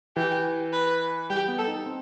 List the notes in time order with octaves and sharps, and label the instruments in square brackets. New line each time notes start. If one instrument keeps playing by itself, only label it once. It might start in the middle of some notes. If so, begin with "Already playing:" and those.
[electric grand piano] E3 [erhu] G4
[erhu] B4
[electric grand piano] G3 [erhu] G4
[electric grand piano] B3
[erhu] A4
[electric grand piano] D#4
C4